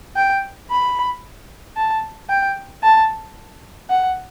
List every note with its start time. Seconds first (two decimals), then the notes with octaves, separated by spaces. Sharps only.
0.16 G5
0.70 B5
1.77 A5
2.29 G5
2.83 A5
3.90 F#5